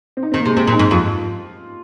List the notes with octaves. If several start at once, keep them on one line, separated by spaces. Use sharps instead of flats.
C4
D#4
D#3 C4
A#3
C3 G#3
C3 C4
A#2
D#4
G#2
F2 F4